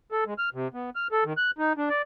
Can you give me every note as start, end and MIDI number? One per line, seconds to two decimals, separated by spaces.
0.12 0.24 69
0.26 0.34 56
0.38 0.49 89
0.54 0.68 48
0.74 0.90 59
0.96 1.07 89
1.12 1.24 69
1.25 1.33 51
1.37 1.51 90
1.59 1.73 63
1.77 1.89 62
1.89 2.02 74